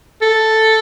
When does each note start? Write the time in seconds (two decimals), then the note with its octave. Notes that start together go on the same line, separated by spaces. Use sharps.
0.22 A4